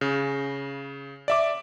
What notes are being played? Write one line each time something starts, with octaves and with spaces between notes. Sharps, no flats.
C#3
D5 E5 D6